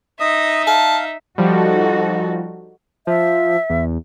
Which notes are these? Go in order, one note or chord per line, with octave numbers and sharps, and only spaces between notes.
D#4 D#5 E5 D#6
F5 A5
F3 G3 D#4 F#4 A4
F3 E5
E2